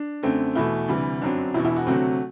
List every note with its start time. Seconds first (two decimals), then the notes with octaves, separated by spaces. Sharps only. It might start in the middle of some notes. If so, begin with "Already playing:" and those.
Already playing: D4
0.23 F#2 D3 A3 C4
0.55 E2 B2 A3 E4
0.88 D2 C3 E3 G3
1.22 G1 F#2 F#3 C4 D4
1.54 E1 E2 B2 E4
1.65 E4
1.76 F#4
1.87 D2 C3 F#3 A3 C4 F#4